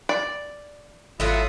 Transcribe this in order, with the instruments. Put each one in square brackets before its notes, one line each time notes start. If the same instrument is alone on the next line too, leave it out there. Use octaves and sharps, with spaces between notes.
[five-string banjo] D5
[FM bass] G#1 [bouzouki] F#3 A3 E4 [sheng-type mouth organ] F4 B5 D#6